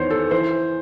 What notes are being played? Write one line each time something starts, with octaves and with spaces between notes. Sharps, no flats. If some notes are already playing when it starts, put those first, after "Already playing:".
Already playing: E2 D#3 C5 C#5
A4
E3 C5